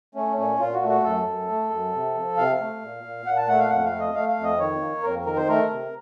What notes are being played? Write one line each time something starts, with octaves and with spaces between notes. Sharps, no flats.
A3 C#4
A#2 C#4
A#2 F4
F#4
A3
F#4
F#2 A4
F#2
A3
F#2
C3
F3
C3 F5
A3
A#2
A#2
A#2 F#5
A5
A3 F#5
F5
F2 F#5
F5
A3
D#5
A3 F5
F5
F2
D#5
D#3 C#5
A#3
F2 A#4
D#3 A#4
C5
A3 A#4
C3